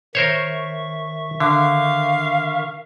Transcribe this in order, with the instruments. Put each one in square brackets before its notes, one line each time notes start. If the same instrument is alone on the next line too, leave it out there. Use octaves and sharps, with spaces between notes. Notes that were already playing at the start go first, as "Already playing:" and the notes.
[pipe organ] D#3 E5 C#6 [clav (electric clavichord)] A#4 C5 C#5
[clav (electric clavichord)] D3 [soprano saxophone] F5